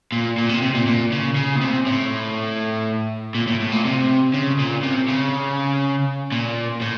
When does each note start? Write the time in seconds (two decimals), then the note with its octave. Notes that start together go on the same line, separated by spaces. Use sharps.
0.12 A#2
0.38 A#2
0.49 C3
0.62 C3
0.74 A#2
0.87 A#2
1.12 C#3
1.36 C#3
1.56 A#2
1.61 C3
1.86 A2
3.35 A#2
3.47 A2
3.60 A2
3.72 A#2
3.84 C3
4.34 C#3
4.59 A#2
4.83 C3
5.08 C#3
6.32 A#2
6.82 A2